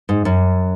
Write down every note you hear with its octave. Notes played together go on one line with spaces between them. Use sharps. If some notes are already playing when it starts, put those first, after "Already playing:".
G#2
F#2